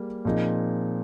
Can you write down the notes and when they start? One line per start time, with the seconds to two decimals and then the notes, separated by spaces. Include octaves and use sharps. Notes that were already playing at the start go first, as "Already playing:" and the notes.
Already playing: G3 A#3 G#4
0.25 A#2 F3 C4 D#4 G#4